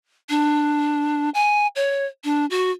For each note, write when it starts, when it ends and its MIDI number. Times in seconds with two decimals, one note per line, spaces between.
0.30 1.30 62
1.34 1.67 80
1.76 2.06 73
2.24 2.46 62
2.50 2.71 66